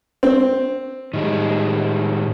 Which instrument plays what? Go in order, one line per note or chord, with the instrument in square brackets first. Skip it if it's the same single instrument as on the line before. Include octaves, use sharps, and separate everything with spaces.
[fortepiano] C4
[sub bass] A2 [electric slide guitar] D#3 G3 G#3